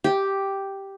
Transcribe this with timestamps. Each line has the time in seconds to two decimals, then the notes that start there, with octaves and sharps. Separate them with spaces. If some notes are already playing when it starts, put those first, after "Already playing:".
0.04 G4